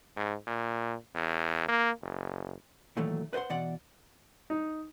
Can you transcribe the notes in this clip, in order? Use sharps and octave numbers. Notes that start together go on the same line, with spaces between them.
G#2
A#2
E2
A#3
F#1
A#2 D#3 E3 F#3 A3
B4 C5 D5 F#5 C6
B2 E3 D5 F#5
D#4